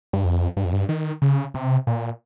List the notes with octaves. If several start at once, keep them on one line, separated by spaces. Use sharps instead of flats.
G2
F2
G2
F2
G2
D#3
C#3
C3
A#2